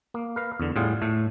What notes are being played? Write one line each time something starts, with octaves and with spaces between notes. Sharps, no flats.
A#3
A#4 B4 F5
E2 D3
A2 G3 F4 G#4 F#5
A2 A3